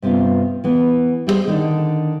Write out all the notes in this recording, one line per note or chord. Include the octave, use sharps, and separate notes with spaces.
G2 C3 B3 C#4 F4
E3 B3
G3 E4 G#4 C5
D3 D#3 D4 D#4